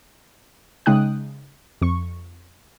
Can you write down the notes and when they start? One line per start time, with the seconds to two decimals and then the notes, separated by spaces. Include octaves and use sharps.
0.86 C#3 G#3 D#4 G5 D#6 F#6
1.82 F2 C#6